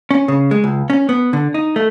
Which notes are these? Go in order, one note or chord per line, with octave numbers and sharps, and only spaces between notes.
C#4
C#3
G#3
C#2
C#4
B3
D3
D#4
A3